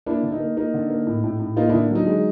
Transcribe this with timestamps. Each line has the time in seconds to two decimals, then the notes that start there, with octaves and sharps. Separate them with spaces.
0.06 A#3 D4 E4
0.23 D3
0.32 D#4
0.40 A#3
0.57 A#3 D#4
0.74 D3
0.90 A#3
1.07 A2
1.24 A2
1.40 A2
1.56 A#3 D#4 F4
1.69 D4 E4
1.74 D3
1.91 F#3 D#4
2.07 G#3